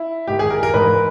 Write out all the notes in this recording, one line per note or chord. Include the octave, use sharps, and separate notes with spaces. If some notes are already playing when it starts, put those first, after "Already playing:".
Already playing: E4
G#2 D#3 G4
G#4
A#4
A#4
G#2 E3 B4